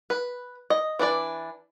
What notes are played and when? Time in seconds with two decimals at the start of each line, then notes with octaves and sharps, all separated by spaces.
0.10 B4
0.70 D#5
0.99 E3 D4 B4 D5